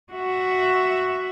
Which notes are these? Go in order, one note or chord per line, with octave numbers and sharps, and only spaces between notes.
F#4 E5